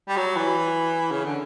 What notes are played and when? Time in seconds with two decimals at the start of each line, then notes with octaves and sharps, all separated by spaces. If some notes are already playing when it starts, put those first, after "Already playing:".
0.08 G3
0.17 F#3
0.36 E3
1.12 C#3
1.25 D3